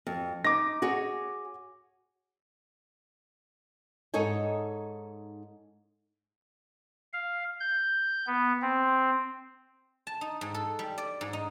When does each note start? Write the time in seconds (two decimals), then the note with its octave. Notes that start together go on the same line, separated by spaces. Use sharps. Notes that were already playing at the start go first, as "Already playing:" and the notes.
0.07 F2
0.45 D#4 D6 A#6
0.82 F#4 G#4 C#5
4.14 G#2 D#4 A4 C#5 G#5
7.13 F5
7.60 G6
8.27 B3
8.62 C4
10.07 A5
10.21 D#4
10.41 G#2
10.54 A4
10.79 G3
10.98 D5
11.21 G#2
11.33 D#4